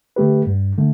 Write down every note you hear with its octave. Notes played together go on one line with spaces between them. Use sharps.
D3 A3 G4 B4
G2
D3 A3